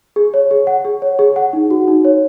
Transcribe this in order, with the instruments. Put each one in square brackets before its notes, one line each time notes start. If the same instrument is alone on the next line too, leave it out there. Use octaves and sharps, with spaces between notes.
[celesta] G#4
C#5
G#4
F#5
G#4
C#5
G#4
F#5
D#4
F#4
D#4
C#5